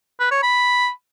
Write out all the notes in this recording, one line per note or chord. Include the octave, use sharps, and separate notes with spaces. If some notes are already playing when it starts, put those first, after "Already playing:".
B4
C#5
B5